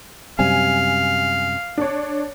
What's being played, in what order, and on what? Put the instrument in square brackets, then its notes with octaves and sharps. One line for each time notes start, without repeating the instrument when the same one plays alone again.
[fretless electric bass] F#2 C3 G3 [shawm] F5 [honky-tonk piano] G#5
[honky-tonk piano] D4 C#5